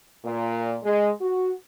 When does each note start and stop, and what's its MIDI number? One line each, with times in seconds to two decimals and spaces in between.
0.25 0.77 46
0.84 1.10 56
1.21 1.52 66